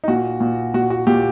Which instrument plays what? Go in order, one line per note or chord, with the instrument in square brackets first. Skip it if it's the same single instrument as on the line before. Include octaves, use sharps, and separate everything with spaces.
[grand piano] D#4
A#2 F#4
A#2
A#2 F#4
F#4
A#2 G4